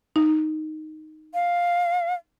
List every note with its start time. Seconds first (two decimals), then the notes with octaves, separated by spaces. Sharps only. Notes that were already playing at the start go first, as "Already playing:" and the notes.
0.16 D#4
1.34 F5